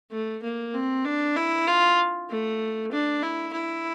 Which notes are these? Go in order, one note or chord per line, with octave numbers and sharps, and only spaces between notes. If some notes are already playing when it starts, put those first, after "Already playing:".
A3
A#3
C4
D4
E4
F4
A3
D4
E4
E4